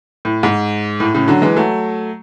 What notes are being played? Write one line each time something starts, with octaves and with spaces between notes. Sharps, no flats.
A2
G#2
A2
A2 C#3
D3 F#3
E3 G#3
F#3 A3